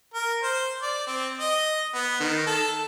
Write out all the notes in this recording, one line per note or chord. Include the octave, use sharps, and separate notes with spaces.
A#4
C5
D5
C4
D#5
B3
D#3
A4